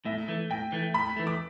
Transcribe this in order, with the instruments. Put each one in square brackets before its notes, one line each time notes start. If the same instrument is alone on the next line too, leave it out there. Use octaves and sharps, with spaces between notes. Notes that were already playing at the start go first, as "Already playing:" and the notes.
[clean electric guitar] A2 [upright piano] E5
[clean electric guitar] E3 A3
[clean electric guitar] A2 [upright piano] G5
[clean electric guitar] E3 A3
[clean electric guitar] A2 [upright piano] B5
[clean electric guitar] E3 A3
[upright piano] D6